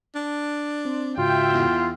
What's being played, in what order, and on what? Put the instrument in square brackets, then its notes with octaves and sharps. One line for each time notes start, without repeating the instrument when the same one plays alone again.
[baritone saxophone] D4
[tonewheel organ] C4
[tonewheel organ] G#2 C#3 F#4 [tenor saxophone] F4 [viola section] E5 G5
[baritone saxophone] E2